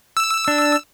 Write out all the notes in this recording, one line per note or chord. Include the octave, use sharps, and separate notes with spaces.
E6
D4